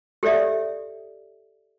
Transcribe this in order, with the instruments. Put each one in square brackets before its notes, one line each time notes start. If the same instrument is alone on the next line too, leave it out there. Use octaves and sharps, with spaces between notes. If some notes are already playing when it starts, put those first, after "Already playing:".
[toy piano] G4 A4 C#5 D5 E5